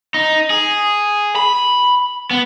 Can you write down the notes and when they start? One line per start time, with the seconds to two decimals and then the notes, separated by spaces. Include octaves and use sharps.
0.14 D#4
0.50 G#4
1.36 B5
2.31 B3